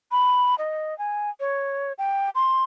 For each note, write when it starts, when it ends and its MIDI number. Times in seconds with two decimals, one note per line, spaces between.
0.11 0.55 83
0.58 0.97 75
0.98 1.30 80
1.40 1.93 73
1.98 2.30 79
2.35 2.64 84